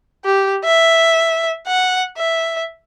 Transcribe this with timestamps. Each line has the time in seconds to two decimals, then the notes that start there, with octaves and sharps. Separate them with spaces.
0.25 G4
0.64 E5
1.67 F#5
2.18 E5